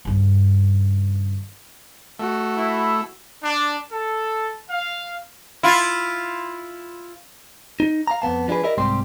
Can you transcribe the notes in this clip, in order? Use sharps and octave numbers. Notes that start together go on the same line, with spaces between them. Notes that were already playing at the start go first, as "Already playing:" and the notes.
G2 C#3
A3 F#4
E4
D4
A4
F5
E4 F4
D#4
F5 A#5
F2 A#2 B3 A5
F3 D4 D#4 G#4 B4
E4 G4 A#4 D5 D#5
C2 G#2 G3 C4 G4 C6